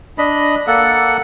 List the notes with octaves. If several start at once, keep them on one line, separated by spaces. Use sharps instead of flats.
D4 D#5 B5
A#3 A4 F#5